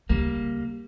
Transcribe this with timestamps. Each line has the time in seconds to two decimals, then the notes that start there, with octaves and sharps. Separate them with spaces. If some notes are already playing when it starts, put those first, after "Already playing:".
0.09 D2 C#3 G3 A#3